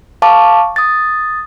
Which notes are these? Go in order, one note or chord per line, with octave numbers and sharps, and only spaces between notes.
F5 A5 C#6 D6
D#6 A6